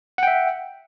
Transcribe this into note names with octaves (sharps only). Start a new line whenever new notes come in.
E5 F#5 G5